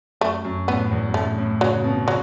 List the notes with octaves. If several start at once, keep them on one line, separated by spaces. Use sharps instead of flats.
F#2 A3
F#2
A2 B3
E2
F#2
A2 A3
A2
C#3 F#3
B2
C#3 F#3